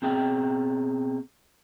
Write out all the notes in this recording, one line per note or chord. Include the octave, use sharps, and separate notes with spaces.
B2 C4 G#4 G5